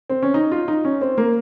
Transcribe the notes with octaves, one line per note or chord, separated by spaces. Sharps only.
C4
C#4
D#4
F4
D#4
C#4
C4
A#3